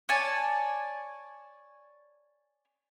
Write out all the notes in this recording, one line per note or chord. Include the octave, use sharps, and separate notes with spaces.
C#5 D5 G#5 A5